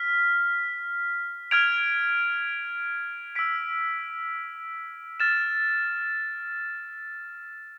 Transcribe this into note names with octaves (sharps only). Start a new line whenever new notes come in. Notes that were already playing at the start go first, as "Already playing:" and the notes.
Already playing: F6 B6
F6 G#6 D7 F7
E6 B6 D7
F6 A6 E7